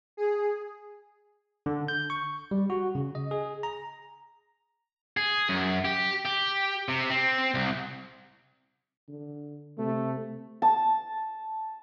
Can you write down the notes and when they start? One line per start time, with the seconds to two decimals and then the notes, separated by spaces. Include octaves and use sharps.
0.17 G#4
1.66 D3
1.88 G6
2.10 C#6
2.51 G3
2.70 F#4
2.95 C#3
3.15 D#5
3.31 G#4
3.63 A#5
5.17 G#4
5.49 F#2
5.85 G4
6.25 G4
6.88 C3
7.10 C4
7.54 C2
9.09 D3
9.78 C3 A3
10.62 A5